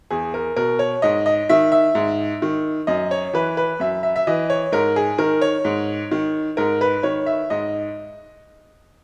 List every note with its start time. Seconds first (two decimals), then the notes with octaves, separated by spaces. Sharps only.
0.11 E2 G#4
0.34 A#4
0.56 B2 A#4
0.79 C#5
1.02 G#2 D#5
1.26 D#5
1.49 D#3 E5
1.72 E5
1.95 G#2
2.42 D#3
2.87 F#2 D#5
3.11 C#5
3.33 E3 B4
3.57 B4
3.80 F#2 E5
4.03 E5
4.16 E5
4.27 E3 D#5
4.50 C#5
4.72 G#2 A#4
4.96 G#4
5.18 D#3 A#4
5.41 C#5
5.65 G#2
6.11 D#3
6.57 G#2 A#4
6.81 B4
7.03 D#3 C#5
7.26 E5
7.50 G#2 D#5